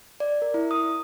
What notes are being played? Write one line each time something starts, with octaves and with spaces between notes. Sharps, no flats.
D5
A#4
E4
D#6